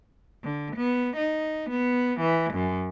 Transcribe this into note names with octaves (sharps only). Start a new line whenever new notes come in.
D3
B3
D#4
B3
E3
F#2